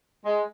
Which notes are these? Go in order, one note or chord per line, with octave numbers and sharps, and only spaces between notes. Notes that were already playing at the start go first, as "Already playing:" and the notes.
G#3